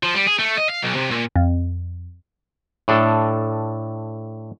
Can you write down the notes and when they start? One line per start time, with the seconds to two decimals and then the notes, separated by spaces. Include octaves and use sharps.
0.03 F3
0.14 G3
0.27 G#4
0.39 A3
0.58 D#5
0.70 F5
0.83 B1
0.96 C3
1.11 A#2
1.36 F2
2.88 A2 D4 A4